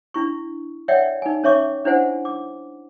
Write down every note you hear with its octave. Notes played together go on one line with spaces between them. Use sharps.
D4 E4 C#6
C#5 D5 E5 F#5 G5
D#4 G#5
C#4 C#5 E5 C#6 D6
C#4 D4 E4 C5 F#5 G#5
D6